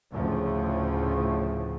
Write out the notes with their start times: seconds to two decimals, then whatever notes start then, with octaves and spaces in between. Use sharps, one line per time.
0.11 D2 A2 C#3 F3